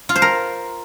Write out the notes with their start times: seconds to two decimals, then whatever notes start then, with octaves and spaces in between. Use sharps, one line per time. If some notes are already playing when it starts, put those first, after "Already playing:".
0.09 F4
0.16 C5
0.22 A#4